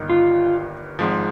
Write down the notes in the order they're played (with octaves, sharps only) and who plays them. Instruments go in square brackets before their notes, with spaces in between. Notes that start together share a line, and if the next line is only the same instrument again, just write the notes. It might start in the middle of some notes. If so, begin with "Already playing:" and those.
Already playing: [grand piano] G1 G2 D#3 A#3 D#4
[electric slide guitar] F4
[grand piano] G#1 G#2 F3